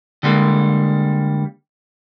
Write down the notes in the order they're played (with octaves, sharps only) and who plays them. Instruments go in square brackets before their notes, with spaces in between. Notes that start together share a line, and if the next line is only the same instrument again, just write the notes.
[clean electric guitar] D3 G3 G#3 A#3